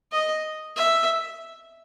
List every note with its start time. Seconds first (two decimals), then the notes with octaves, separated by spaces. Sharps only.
0.12 D#5
0.76 E5